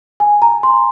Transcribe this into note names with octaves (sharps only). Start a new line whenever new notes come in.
G#5
A#5
C6